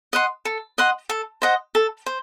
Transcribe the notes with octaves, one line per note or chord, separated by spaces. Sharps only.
D#5 F#5 C6
A4
D#5 F#5 C6
A4
C5 D#5 F#5
A4
C5